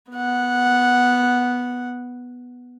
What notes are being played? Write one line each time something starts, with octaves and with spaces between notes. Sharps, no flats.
B3 F#5